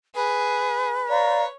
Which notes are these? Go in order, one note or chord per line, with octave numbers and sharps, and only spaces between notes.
G#4 B4
C#5 D5 F5 A#5